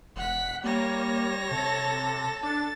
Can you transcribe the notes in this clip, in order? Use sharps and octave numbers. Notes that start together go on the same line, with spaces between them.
E1 F#5 B6
G3 A#3 C#5 A#6
C3 A4
D4 A6